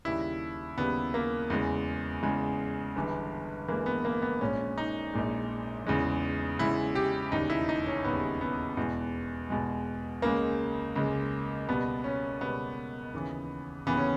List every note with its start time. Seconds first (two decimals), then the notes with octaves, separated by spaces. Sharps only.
0.05 D#2 C#3 G3 E4
0.77 D#2 C#3 G3 B3
1.14 A#3
1.50 E2 C#3 G#3
2.22 E2 C#3 G#3
2.96 G1 G2 E3 G#3
3.68 G1 G2 E3 G#3 A#3
3.86 B3
4.05 A#3
4.22 B3
4.41 A#1 A#2 G#3 C#4
4.78 D#4
5.13 A#1 A#2 G#3
5.87 E2 C#3 G#3
6.59 E2 C#3 G#3 E4
6.95 G4
7.32 E1 D#2 C#3 G3 D#4
7.50 E4
7.69 D#4
7.86 C#4
8.04 E1 D#2 C#3 G3 B3
8.41 B3
8.77 E2 B2 G#3
9.50 E2 B2 G#3
10.22 C#2 C#3 G#3 A#3
10.96 C#2 C#3 G#3
11.68 C#2 B2 G3 B3
12.04 C#4
12.41 C#2 B2 G3 B3
13.13 D#2 C#3 E3
13.87 D#2 C#3 E3 B3
13.97 C#4